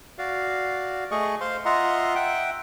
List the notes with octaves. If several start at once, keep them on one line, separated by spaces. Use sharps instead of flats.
F#4 D5 F5
A3 G#4 D#5 C#6
C5 F5 C6
F4 D#5 E5 F#5 A#5 C6
E5 F#5 G5